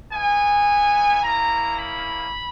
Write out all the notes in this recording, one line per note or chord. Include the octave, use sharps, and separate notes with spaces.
B3 E4 G#5
A#3 C#4 E4 A#5
B5